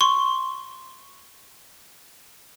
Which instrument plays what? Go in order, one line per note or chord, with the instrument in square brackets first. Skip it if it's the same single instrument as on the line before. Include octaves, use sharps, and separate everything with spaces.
[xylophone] C6 C#6